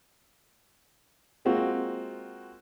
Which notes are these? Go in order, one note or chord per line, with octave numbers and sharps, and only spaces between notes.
G#3 A#3 C4 F4 F#4